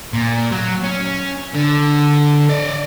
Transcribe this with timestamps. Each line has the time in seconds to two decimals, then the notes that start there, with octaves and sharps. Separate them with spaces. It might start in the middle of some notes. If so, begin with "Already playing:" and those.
0.13 A#2
0.52 F#3
0.84 C#4
1.55 D3
2.49 D5 D#5